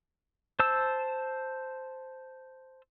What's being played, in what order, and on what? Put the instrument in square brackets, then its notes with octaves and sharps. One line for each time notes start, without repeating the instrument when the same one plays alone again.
[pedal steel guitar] C5 A5 E6